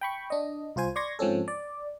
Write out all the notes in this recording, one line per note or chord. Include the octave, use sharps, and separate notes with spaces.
G5 B5 C#6
D4 D#5
C2 F4 C5 G#5
D5 C6 C#6 G#6 A#6
G#2 F3 C4 C#4 A4
D5